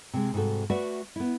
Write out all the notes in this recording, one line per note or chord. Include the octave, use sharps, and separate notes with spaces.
C3 G#3
G#2 C3 G3 F#4 A4
A3 F#4 B4 D5 E5 F#5
B3 E4